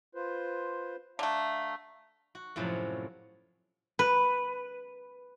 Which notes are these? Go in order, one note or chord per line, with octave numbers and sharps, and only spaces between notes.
F4 B4 C5
D3 A3 E5 F5 A#5
F#4
F#2 A2 C3 F3 F#3
B4